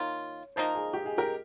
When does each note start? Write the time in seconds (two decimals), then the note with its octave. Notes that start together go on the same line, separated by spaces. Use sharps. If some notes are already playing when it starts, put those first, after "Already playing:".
Already playing: D#3 A#3 F4 C#5
0.56 F3 A#3 D#4 A#4 C5 D#5
0.75 G#4
0.93 G4
1.06 G#4
1.18 G4 A#4